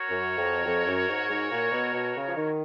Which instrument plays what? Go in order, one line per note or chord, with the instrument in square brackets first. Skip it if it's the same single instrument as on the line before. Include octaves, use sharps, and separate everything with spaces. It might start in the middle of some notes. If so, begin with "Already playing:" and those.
Already playing: [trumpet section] F#4 A#4 C#5
[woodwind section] F#2
F2
F2
F#2
G#2
G#2
A#2
B2
B2
C#3
F3
D#3